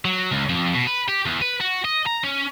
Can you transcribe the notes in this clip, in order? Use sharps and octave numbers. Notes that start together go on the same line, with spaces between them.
F#3
C#2
F2
B2
B4
G4
E2
B4
F#4
D#5
A#5
C#4